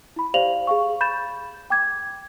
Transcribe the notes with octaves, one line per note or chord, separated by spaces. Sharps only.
E4 B5
G4 C5 D5 F5 F7 F#7
G#4 F5 C#6
B5 G6 A6 E7
G5 D6 G#6